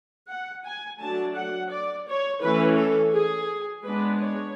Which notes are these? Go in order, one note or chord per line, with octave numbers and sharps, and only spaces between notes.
F#5
G#5
F#3 A3 D4 A5
F#5
D5
C#5
E3 A3 C#4 B4
A4
G#4
G#3 B3 D4 B4
C#5